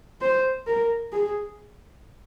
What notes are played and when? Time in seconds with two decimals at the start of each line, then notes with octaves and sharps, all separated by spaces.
0.21 C5
0.67 A#4
1.13 G#4